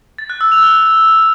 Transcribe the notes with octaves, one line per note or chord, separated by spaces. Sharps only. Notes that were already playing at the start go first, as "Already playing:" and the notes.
A6
F#6
E6
F7
F6